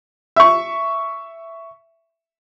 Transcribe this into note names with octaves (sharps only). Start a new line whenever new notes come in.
E5 C#6